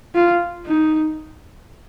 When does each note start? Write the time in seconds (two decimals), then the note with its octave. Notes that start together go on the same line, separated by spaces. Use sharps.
0.15 F4
0.66 D#4